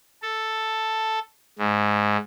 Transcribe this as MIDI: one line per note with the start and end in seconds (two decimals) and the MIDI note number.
0.23 1.19 69
1.59 2.17 44